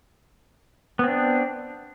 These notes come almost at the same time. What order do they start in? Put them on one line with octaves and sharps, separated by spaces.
B3 C4 D4